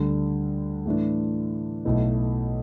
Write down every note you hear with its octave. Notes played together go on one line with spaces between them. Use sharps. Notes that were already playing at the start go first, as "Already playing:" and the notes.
Already playing: D2 D3 G3
A2 E3 A3 D4
B1 B2 A3 E4